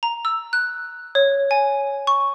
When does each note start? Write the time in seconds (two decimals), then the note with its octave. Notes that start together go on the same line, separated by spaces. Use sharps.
0.03 A#5
0.25 E6
0.53 F#6
1.15 C#5
1.51 G#5
2.07 C#6